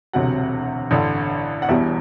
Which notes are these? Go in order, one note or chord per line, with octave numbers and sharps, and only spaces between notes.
E1 D2 C3 F#3 F#5
A1 G2 D3
F#5
E1 E2 B2 G3 E5